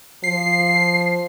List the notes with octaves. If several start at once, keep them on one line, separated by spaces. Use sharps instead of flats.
F3 C7